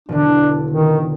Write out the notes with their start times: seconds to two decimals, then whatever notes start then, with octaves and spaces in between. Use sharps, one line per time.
0.09 E1 D3 D4
0.71 D#3